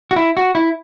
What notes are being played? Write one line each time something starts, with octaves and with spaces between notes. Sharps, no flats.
F#4
E4
F#4
E4